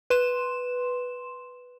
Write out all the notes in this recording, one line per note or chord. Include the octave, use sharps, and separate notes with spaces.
B4 C6 E7